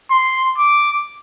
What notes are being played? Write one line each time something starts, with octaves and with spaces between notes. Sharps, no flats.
C6
D6